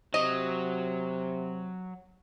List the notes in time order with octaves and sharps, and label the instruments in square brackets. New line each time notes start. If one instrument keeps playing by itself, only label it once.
[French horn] C3 [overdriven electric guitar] F#3 [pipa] D#5